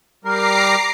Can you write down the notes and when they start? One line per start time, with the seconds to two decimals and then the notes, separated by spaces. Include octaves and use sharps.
0.24 G3 A#4 A#5 D6 C7